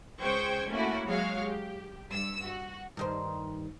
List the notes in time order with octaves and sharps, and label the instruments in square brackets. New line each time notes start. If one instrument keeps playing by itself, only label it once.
[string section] C#2 G#3 C5 G5 C#6 G#6
A3 A#3 C#4 E4 F#4
F#3 G#3 F#4 C#5 F5
G4
G2 E6
F#4
[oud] G2 D#3 C5